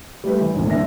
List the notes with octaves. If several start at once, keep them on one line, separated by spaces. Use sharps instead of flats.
G3 A3 G4 B4
E3
G#1 D2 A#2
D#1 D3 D4 E5 A#6